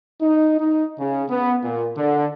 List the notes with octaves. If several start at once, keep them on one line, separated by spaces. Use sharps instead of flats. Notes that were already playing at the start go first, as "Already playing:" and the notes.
D#4
D#4
C#3
B3
A#2
D3